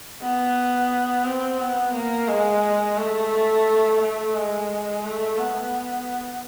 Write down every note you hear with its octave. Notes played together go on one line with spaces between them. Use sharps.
B3
C4
B3
A#3
G#3
A3
A3
G#3
A3
B3